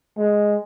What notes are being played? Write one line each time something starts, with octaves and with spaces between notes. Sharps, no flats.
G#3